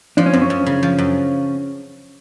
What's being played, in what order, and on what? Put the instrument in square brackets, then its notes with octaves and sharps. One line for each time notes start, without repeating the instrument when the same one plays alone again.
[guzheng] F3 [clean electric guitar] D4
[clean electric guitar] C#4
[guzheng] F#2 [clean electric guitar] C4
[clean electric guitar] C#4
[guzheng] F#2
C#3
F3
F#2